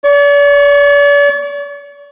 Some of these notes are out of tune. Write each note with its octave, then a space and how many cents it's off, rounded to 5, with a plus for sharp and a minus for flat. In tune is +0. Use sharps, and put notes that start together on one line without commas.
D5 -40 C#6 +5